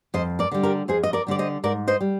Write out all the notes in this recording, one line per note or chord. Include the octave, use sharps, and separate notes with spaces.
F2 C5 D#5
A#4 D5
D3 G3
G4 A#4
F2 G#4 C5
D#5
A#4 D5
D3 G3 D5
C5 D#5
G#2 A#4 D5
C5 D#5
G3